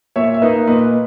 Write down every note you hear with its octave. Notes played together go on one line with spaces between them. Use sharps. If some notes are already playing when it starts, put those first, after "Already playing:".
A#2 C#5 E5
E5
A#3 D#4 B4 D#5
A#2 B4 D#5